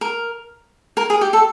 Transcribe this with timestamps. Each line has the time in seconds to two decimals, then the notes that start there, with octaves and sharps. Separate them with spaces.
0.01 A#4
0.97 A#4
1.10 G#4
1.21 G4
1.33 A4